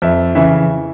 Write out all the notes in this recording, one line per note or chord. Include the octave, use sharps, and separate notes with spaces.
F2 E5
C#3 E3 E5